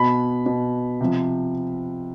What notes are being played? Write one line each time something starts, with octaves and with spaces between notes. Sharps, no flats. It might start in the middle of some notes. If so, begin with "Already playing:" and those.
Already playing: B2 B5
B2
C3 F3